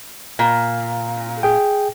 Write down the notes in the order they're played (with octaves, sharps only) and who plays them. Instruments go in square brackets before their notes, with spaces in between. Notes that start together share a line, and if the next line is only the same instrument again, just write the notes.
[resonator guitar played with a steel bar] A#2
[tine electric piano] G#4 G5